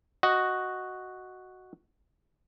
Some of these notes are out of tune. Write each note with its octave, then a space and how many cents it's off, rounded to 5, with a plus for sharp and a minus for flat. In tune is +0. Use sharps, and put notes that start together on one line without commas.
F#4 +0 D#5 +0